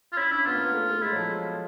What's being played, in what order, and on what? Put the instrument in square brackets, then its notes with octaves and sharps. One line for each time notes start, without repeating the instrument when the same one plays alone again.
[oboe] F4
[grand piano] C#4 [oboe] E4
[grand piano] D4 [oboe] E4
[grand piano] B3 [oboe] F4
[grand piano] A#3
B3
A3
A3
[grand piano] G#3 [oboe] E4
[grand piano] F#3
F3